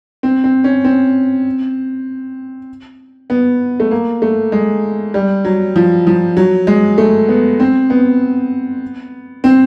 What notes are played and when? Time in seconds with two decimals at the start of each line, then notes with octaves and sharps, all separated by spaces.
0.23 C4
0.44 C4
0.64 C#4
0.84 C4
3.30 B3
3.80 A3
3.91 A#3
4.22 A3
4.52 G#3
5.14 G3
5.45 F#3
5.76 F3
6.07 F3
6.37 F#3
6.67 G#3
6.98 A3
7.28 B3
7.60 C4
7.90 B3
9.44 C4